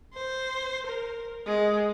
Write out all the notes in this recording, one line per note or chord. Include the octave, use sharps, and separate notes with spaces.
C5
A#4
G#3